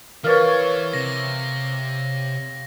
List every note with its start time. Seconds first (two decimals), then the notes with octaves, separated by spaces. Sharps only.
0.24 E3 A#4 B4 C#5 D5 F5
0.93 C3 A#6